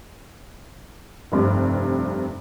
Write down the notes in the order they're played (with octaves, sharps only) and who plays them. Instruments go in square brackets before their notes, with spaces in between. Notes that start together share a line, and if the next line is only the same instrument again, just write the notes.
[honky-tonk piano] F1 G2 C3